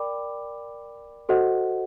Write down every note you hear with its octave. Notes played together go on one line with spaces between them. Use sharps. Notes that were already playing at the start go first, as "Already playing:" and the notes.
Already playing: A#4 D5 G5 B5 D6
F#4 A4 C5 D#5 F#5